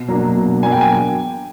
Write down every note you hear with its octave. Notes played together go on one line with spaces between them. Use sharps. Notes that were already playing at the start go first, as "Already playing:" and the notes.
Already playing: B2
F#3 A#3 D4
B2
F#3 A#3 D4 G#5
G5
G#5